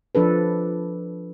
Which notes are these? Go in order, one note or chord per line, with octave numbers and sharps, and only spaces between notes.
F3 D4 A4 B4